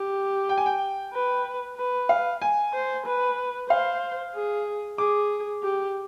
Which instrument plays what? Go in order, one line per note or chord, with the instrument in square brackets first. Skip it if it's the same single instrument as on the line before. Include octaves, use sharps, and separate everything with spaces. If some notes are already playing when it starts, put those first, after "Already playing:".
Already playing: [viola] G4
[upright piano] G5
G#5
G5
[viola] B4
B4
[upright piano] F5
G#5
[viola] C5
B4
[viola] C5 [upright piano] F5
[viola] G#4
[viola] G#4 [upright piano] D6
[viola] G4